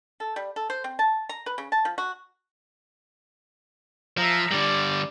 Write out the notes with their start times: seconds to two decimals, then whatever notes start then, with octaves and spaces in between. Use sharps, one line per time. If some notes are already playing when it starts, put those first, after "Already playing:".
0.20 A4
0.36 G3
0.56 A4
0.70 C5
0.84 C4
0.99 A5
1.29 A#5
1.46 B4
1.58 C#3
1.72 A5
1.85 F3
1.98 F#4
4.17 F3 E5 A#5
4.52 D3 G3 D5